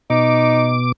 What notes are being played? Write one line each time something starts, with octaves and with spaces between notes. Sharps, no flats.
B2 D#4 D6